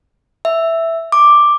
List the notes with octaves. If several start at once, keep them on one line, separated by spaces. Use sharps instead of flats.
E5
D6